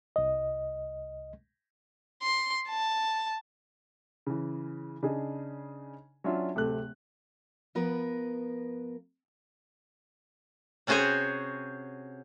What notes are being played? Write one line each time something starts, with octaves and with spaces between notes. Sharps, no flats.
C2 D#5
C6
A5
C#3 E3
C#3 D4 D#4 G#4
F#3 C#4 D4 F4 E5
D1 C3 A3 A4 F#6
F3 B3 A#4 B4
C3 C#4 F#4 G#4 C5 C#5